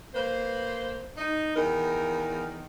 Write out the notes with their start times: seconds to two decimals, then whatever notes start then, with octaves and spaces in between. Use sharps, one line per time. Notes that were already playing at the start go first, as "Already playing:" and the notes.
0.15 A#3 B4 C5
1.17 D#4
1.56 E2 D#3 A#4